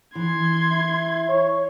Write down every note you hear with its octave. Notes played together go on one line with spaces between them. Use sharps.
E3 C6 G#6
E4
C#5